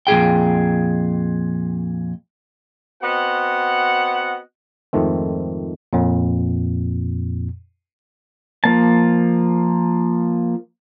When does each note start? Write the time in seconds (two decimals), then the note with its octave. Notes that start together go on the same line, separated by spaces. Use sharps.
0.07 F2 A#2 G#4 G5
3.03 B3 C4 F#4 D#5 F#5
4.93 F2 G#2 D#3 A3 C4
5.93 F2 A#2
8.64 F3 A#3 A5